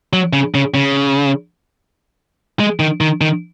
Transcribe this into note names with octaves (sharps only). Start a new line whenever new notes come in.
F#3
C#3
C#3
C#3
G#3
D#3
D#3
D#3